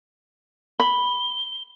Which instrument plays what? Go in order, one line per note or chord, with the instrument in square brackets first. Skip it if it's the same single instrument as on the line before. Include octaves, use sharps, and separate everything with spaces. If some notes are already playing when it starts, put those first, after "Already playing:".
[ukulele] B5 [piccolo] G7